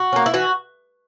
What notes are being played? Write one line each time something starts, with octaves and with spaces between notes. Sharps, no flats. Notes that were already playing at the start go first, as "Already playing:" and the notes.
Already playing: F#4
A#3 C#4
E4
E3 F#4